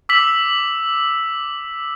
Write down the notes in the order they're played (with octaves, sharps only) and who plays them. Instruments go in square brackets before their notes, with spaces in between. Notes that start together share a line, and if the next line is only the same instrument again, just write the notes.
[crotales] D6 E6 B6 F#7